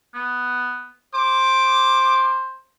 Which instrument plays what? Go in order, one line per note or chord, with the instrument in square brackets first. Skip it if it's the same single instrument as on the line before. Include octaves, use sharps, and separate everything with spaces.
[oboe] B3
[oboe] C5 [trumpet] D6